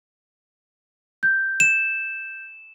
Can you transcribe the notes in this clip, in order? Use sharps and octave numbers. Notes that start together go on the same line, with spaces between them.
G6
E7